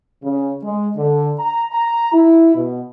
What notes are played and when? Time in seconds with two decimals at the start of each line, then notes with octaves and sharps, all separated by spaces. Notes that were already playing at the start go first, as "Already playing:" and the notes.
0.23 C#3
0.63 G#3
0.96 D3
1.39 A#5
1.73 A#5
2.13 E4
2.55 B2